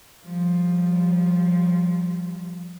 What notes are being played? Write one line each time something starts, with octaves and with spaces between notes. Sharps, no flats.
F3 G3